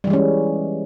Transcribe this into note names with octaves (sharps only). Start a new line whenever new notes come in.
E3 G3 G#3 C#4